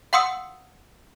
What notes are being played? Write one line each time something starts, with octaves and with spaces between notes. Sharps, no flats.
F5 F#5 C6 D#6 E6 C#7